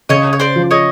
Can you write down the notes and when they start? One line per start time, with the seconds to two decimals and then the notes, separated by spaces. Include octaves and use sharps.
0.09 C#3 C#5 D#5
0.33 C#5
0.40 C5 D5
0.56 F3
0.71 C#5 D#5